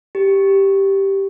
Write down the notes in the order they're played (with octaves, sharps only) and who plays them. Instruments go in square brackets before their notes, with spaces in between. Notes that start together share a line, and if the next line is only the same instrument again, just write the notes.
[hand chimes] G4